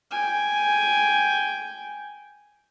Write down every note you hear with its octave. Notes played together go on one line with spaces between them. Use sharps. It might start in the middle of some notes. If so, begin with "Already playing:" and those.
G5 G#5